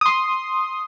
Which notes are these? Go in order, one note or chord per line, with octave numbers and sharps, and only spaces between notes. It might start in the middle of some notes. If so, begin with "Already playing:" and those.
C6 D#6